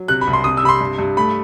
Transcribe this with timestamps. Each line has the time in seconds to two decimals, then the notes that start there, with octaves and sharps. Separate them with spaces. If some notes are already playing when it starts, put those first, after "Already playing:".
Already playing: F#3
0.08 C3 F#6
0.21 B5
0.27 C2
0.33 C6
0.44 C3 D#6
0.57 E6
0.63 C3 B5
0.69 C6
0.81 G2
0.99 G2
1.17 A3 B5